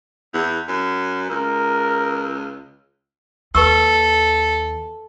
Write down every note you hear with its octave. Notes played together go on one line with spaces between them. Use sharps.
E2
F#2
C#2 A#4
D#2 A4 B4 C#6 E6